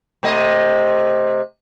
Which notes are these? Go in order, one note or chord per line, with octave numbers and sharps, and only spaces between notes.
C3 A3 D#5